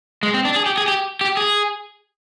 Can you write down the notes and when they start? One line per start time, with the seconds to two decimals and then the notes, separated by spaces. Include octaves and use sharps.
0.23 G#3
0.34 C4
0.45 D4
0.56 G#4
0.66 G4
0.78 G#4
0.88 G4
1.21 G4
1.37 G#4